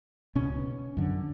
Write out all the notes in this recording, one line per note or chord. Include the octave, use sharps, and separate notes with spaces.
C#2 B2 C#4
F#2 D3